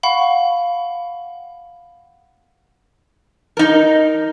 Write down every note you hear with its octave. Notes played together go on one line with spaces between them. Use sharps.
F5 F#5 B5 C#6
D#4 A#4